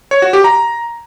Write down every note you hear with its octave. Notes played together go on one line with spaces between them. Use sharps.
C#5
F#4
G4
A#5